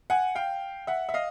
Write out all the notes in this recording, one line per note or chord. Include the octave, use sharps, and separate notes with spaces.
F#5 G#5
F5 G5
E5 F#5
E5
D#5 F5